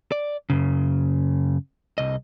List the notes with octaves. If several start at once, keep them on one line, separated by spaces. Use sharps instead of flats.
D5
F#2 C#3
C2 D#5